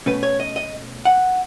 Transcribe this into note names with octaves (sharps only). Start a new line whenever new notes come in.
B2 A3 C#4 B4
C#5
D#5
D#5
F#5